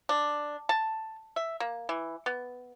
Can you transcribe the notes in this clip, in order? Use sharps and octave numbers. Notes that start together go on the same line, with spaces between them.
D4
A5
E5
A#3
E3
B3